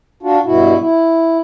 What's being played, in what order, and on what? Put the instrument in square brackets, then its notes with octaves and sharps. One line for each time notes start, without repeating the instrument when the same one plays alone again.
[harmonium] D4 F4 F#4
G2 B2 E4 F#4
E4